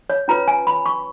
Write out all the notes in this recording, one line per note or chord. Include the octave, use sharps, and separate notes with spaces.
C#5
C#4 F4 B4 A#5
G#5
B5
C#6